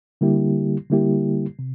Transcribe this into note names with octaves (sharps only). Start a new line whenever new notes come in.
D3 G3 A#3 E4 G4
D3 G3 A#3 E4 G4
C3